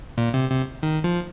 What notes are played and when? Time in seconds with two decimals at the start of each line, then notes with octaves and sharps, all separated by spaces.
0.18 A#2
0.34 C3
0.50 C3
0.83 D#3
1.04 F3